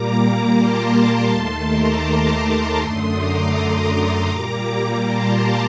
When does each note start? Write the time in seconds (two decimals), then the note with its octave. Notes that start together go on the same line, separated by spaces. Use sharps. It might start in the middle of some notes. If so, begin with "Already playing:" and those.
Already playing: A#2 G3 A#3 A#5 D6
0.54 A5 C6
1.28 D#2 D#3 A3 A5 C6
1.65 A#5 D6
2.78 F#2 D3 A3 C6 D#6
3.16 A#5 D6
4.28 A#2 G3 A#3
5.03 A5 C6